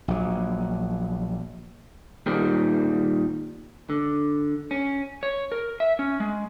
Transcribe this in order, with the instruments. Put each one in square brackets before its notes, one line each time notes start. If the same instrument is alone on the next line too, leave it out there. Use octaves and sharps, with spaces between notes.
[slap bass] A#1 F#3
[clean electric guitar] A#2 D#3 G3 C4
D3
C#4
[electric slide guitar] C#5
A#4
E5
C#4
G#3